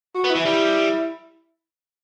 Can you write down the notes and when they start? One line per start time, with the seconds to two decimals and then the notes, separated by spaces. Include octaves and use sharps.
0.15 F#4
0.24 B3
0.30 E4
0.35 E3
0.45 G3